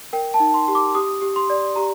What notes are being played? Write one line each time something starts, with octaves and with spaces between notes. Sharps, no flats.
A#4 G5
A5
D#4
C6
G4
D6
G4 D#6
G4
C6
D5
G4 A#5